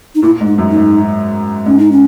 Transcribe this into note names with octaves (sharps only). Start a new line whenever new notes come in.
D#4
A#2 E4
G#2
D#4
F#2
D#4
G#2
G#2 C#4
D#4
C#4